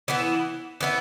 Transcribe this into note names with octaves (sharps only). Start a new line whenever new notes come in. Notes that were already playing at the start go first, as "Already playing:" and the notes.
E3 B3 E4
E3 B3 E4